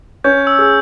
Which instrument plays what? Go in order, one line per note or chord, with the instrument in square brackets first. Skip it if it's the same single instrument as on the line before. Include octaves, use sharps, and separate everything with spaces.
[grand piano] C#4 [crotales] G6
[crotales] E6
[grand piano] G#4